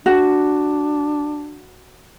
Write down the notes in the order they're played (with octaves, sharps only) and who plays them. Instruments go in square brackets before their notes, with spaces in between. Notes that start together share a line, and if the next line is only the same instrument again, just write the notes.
[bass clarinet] D4 [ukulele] F#4